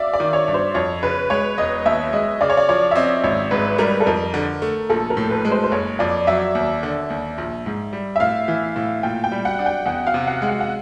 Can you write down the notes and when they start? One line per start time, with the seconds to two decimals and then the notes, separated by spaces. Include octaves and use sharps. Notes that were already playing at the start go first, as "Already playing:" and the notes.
Already playing: D5 E5 F5
0.14 D5
0.20 D#3
0.33 C#5
0.48 G2
0.54 C5
0.74 F2 C#5
1.03 C#3 B4
1.30 G#3 C#5
1.58 E1 D#5
1.86 D#2 E5
2.13 G#3 D#5
2.41 C#3 D5
2.50 C#5
2.57 D5
2.69 F3 C#5
2.91 E5
2.95 C4 D#5
3.24 G#1 C#5
3.51 G#2 B4
3.78 G3 A#4
4.00 A4
4.06 F2 A#4
4.34 D3
4.62 A3
4.90 A#1 A4
5.10 A#4
5.17 A2
5.30 B4
5.45 G#3
5.51 C5
5.64 C5
5.71 F#1 C#5
5.99 F2 D5
6.27 F#3 E5
6.55 D#2
6.83 D3
7.10 D#2
7.38 A#1
7.66 G#2
7.93 G3
8.16 E5
8.20 A2 F5
8.48 E3
8.76 A2
9.03 A#2 G5
9.24 G5
9.32 G3
9.45 F#5
9.59 D4
9.66 G5
9.86 E2 F#5
10.07 F5
10.14 C3
10.27 F#5
10.42 G#3
10.49 F#5
10.61 F#5